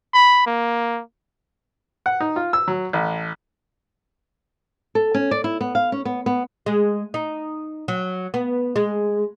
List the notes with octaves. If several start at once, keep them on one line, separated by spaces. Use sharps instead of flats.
B5
A#3
F#5
D#4
F4
E6
F#3
A1
A4
C#4
D5
E4
B3
F5
C#4
B3
B3
G#3
D#4
F#3
B3
G#3